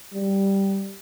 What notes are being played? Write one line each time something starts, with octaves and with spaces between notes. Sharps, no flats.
G3